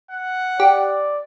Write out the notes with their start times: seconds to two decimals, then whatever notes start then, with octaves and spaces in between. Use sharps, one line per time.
0.11 F#5
0.60 G4 D5